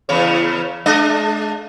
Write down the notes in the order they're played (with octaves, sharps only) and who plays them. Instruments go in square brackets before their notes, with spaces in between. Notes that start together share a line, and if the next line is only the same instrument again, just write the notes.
[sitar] E2 C#3 C#5
G#3 D4 D#5